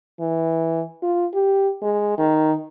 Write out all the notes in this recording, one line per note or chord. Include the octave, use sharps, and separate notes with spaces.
E3
F4
G4
G#3
D#3